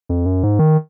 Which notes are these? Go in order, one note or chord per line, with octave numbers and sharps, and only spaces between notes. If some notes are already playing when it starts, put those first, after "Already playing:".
F2
F#2
G#2
D#3